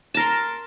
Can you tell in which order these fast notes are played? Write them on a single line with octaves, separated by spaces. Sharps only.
A5 A#4 C6